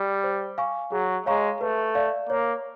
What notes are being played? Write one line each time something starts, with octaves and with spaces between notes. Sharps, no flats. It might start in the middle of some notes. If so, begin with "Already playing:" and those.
Already playing: G3
C5
F5 G#5 C#6
F#3 G#4
G#3 C#5 F5 A#5 C#6
A3 B4
D5 F5
A#3 C#5